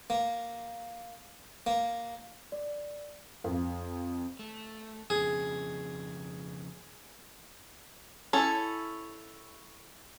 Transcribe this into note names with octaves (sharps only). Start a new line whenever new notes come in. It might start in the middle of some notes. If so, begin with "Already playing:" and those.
A#3
A#3
D5
F2
A3
F2 C#3 G#4
C#4 E4 A4